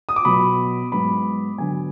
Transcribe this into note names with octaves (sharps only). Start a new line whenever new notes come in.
D#6
D6
B2 F#3 B3 B5
G#2 F#3 B3 B5
D3 F#3 B3 G#5